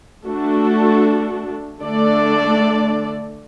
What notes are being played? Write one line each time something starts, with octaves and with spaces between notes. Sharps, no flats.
A3 D4 F#4 A4
D3 A3 D4 A4 D5